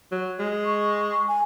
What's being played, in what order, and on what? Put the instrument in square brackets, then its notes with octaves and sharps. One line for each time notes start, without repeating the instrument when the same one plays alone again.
[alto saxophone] F#3
G#3
[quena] C#6
G#5